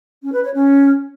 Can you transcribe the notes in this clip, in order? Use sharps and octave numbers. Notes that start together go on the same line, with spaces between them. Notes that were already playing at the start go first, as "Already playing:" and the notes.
C#4
B4
C#5
C#4